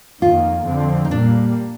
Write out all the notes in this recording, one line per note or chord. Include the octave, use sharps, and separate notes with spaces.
F2 D#3 A#3 F4
F2 D3 F3 C4
D#4
A#2 G3 A#3 D4